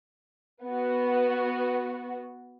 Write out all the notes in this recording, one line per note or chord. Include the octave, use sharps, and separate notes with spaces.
B3 F#4